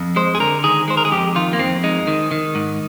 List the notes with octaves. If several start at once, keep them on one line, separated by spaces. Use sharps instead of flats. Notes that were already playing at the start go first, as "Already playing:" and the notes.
Already playing: F2
G#3 C5
G#4
D3 A#4
D#3 G#4
G#3 C5
A#4
G#4
F2 G4
D#3 F4
A#3
F2 C4
G#3 D#4
D#3
D#3
G#2